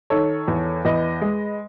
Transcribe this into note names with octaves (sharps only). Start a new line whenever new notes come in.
D#3 A4 C#5
E2
E2 B4 D#5
G#3